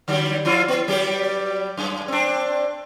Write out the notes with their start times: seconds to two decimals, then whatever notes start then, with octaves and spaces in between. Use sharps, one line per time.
0.08 D3 F#3 G3
0.45 F3 E4 F4
0.68 B3
0.88 F#3 G3 G4
1.77 F#2
2.08 C4 D4